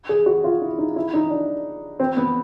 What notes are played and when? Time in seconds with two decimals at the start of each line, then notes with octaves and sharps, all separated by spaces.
0.09 G#4
0.26 F#4
0.44 F4
0.62 E4
0.79 D#4
0.96 E4
1.14 D#4
1.30 D4
2.00 C4
2.17 B3